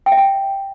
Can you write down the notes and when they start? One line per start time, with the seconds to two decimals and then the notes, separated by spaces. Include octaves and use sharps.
0.06 G5
0.12 E5
0.17 G5